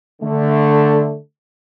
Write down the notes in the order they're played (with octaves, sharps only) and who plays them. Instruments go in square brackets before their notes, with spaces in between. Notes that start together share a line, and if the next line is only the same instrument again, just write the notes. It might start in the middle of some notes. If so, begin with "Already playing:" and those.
[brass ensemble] D3 A3